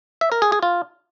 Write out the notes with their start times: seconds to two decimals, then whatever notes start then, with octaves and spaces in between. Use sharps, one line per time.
0.21 E5
0.32 A#4
0.42 G#4
0.52 G#4
0.63 F4